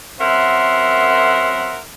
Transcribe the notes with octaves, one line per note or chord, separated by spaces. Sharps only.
F#2 C4 A#4 E5 F#5 C6